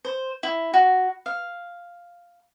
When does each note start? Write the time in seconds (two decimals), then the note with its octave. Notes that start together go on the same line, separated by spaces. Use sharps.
0.05 C5
0.43 E4
0.73 F#4
1.26 F5